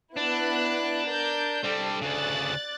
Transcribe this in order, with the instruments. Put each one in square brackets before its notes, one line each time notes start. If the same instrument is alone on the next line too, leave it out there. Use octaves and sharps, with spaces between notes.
[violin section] B3 E4 F#6 [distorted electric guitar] D4
[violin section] A#4 G6
[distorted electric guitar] G3 C4 [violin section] D4 A4
[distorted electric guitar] D2 C#3 [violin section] D5 F#6 A6